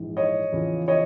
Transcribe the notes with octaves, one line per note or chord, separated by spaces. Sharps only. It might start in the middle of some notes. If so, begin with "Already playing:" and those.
Already playing: A#1 G#2 E3
C#5 D#5
E2 C#3 F3
C#5 D#5